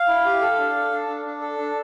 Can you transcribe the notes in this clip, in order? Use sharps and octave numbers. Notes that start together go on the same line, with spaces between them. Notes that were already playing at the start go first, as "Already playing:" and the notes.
Already playing: F5
E4
G4
A4
D4
A4
D4
D4
D4
A4
D4